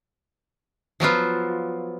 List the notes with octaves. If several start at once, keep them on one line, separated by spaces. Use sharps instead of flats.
F3 F#3 B3 F4